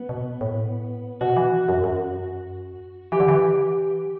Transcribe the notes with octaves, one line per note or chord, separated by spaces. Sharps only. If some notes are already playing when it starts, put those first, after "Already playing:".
Already playing: B3
B2
A2
B2 F#4
E3
F#2
F#2
E3 G4
D3
E3